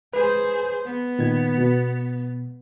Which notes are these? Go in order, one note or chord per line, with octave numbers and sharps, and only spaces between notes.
G#4 B4 C5
B3
A#2 D#3 G#6
B2